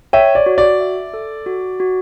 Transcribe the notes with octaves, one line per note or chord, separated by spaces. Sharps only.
C#5 E5 G5
D5
F#4
D5
E5
A4
F#4
F#4